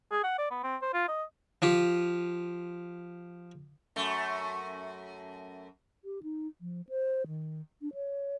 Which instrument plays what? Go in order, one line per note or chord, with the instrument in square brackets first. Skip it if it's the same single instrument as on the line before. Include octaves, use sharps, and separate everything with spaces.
[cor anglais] G#4
F#5
D5
B3
C4
C5
F4
D#5
[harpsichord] F3 F4 G4
[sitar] F#2 A3
[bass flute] G4
D#4
F3
C5
D#3
D4
C#5